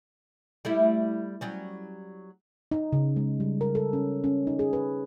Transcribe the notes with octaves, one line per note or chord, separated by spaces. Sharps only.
G3 A3 E4
F#3 G3 C#4
D#4
C#3
G#3
G3
A#4
A4
C#4
C#4
D#4
G#4
B4